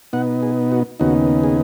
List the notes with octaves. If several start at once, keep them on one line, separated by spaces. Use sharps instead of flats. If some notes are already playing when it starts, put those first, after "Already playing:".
B2 B3 D#4 F#5
G#4
F#4
D#2 C#3 B3 D#4 F#4
G#4